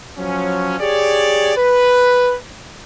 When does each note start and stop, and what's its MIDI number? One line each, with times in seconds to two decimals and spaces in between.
0.18 0.78 53
0.18 0.78 54
0.18 0.78 61
0.79 1.53 67
0.79 1.53 68
0.79 1.53 73
0.79 1.53 74
1.57 2.35 71